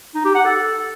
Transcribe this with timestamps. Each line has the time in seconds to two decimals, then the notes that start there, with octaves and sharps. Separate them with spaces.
0.14 D#4
0.25 G4
0.35 F#5
0.45 A4